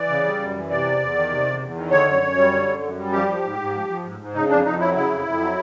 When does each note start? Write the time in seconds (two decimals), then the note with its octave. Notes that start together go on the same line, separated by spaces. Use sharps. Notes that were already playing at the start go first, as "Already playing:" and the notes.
Already playing: E3 D5
0.09 C#3
0.25 G3
0.39 F#2
0.54 E3
0.70 C3 D5
0.85 E2
1.00 E2
1.15 D#3
1.30 C3
1.46 E2
1.61 E2
1.76 D#3
1.91 D3 C#5
2.07 F#2
2.22 F#2
2.37 G3
2.52 D3
2.67 F#2
2.83 F#2
2.97 G3
3.12 F3 G4
3.28 F3
3.43 G#2
3.58 G#2
3.73 F3
3.89 F3
4.04 G#2
4.19 G#2
4.34 C#3 D#4
4.49 F2 D4
4.65 F2 D#4
4.80 F#3 E4
4.95 C#3 E4
5.11 F2
5.26 F2
5.41 F#3